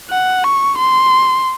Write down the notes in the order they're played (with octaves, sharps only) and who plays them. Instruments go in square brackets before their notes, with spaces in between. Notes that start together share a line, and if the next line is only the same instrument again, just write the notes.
[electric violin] F#5
C#6
C6